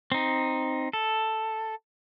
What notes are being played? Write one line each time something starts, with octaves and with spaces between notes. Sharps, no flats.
C4 D#4
A4